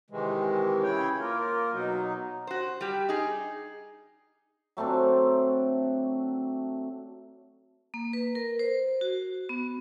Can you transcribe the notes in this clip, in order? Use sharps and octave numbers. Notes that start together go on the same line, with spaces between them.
C3 D#3 E3 G#3
C#3 E4 C#5 G5
A#3 F4 A#4
B2 F#3 D#4
F#4 C5
G3 G4
D#4 G#4
F#3 A3 C4 D4
A#3
B4
A#4
C5
F#4
B3